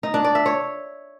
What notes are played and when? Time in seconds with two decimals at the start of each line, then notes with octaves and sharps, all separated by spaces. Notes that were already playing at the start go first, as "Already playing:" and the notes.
0.03 D#4
0.14 D4
0.24 D5
0.35 E5
0.46 C#5